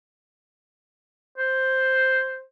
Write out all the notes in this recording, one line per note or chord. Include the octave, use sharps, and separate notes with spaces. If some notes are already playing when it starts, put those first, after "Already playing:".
C5